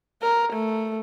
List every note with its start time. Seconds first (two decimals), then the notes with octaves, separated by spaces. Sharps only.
0.22 A#4
0.53 A3